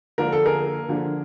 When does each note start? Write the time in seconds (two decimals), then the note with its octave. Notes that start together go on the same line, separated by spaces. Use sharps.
0.18 D3 F3 A#3 D4 A#4
0.33 A4
0.45 G#4 A#4
0.89 D3 F3 A#3 D4